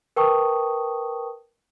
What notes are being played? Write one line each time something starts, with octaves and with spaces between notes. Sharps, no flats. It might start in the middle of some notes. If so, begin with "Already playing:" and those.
A#4 B4 G5 A5 C#6 D#6